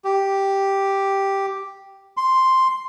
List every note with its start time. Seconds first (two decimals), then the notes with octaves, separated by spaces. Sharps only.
0.05 G4
2.17 C6